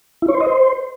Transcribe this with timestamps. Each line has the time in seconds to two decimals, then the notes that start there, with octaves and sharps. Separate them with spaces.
0.22 E4
0.28 C#5
0.34 C5
0.40 D#5
0.46 C5